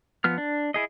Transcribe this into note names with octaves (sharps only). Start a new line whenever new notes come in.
F3 B3 F6
D4
E4 G#4 D#5